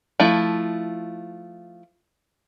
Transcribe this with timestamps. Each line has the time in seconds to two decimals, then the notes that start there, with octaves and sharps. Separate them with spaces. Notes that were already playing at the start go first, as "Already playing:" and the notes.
0.20 F3 A3 E4